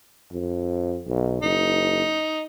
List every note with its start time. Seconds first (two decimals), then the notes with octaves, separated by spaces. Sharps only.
0.32 F2
1.08 B1
1.42 F#1 D#4